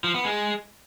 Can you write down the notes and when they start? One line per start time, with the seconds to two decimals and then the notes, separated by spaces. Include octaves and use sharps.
0.04 F3
0.14 B3
0.25 G#3